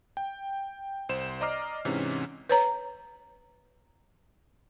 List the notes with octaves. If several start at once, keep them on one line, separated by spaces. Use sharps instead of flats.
G5
C2 C5 E7
D5 D#5 A#5 D6 F6 C7
G#2 C3 E3 C#4
B4 C#5 A#5